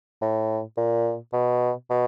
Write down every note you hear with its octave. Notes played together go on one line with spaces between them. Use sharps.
A2
A#2
B2
B2